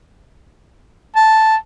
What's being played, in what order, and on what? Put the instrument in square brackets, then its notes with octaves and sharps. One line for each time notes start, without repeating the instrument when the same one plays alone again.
[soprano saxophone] A5